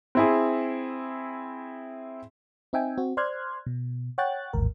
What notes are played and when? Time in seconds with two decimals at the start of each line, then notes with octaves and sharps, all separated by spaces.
0.15 C4 E4 G#4
2.73 C4 D#4 E5 G5 G#5
2.98 C4 F#4
3.17 C5 D5 C6 F6 F#6 G#6
3.66 B2
4.18 C#5 F#5 G5 F#6 A6
4.53 A1 D#2 G#2 A#4